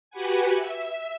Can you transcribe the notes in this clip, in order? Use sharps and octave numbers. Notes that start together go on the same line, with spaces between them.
F#4 G4 B4 F#5 G#5
E5